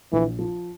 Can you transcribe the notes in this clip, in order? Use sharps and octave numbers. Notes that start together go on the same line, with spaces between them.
A#1 E3
F3